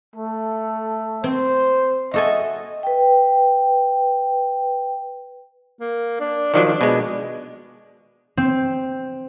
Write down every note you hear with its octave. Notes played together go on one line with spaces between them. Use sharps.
A3 A4
C4 C5
F#4 A4 D#5 E5 G#5
B4 G5
A#3
D4
D#3 F3 F#3 D4
D4
B2 G#3
C4